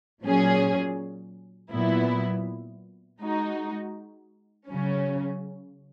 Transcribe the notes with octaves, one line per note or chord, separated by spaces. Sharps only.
A#2 F#3 C#4 G#4
A#2 F#3 B3 E4
G#3 D#4 F#4
C#3 F#3 C#4